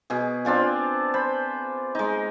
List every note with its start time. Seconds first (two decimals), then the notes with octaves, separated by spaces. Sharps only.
0.10 B2 G#4
0.45 C4 D4 F4 G#4
1.14 C5 B5
1.95 G#3 D#4